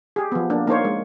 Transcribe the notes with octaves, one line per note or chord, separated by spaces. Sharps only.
G4 G#4
F3 B3
A#3 D4
A#3 D#4 C5 C#5
G#3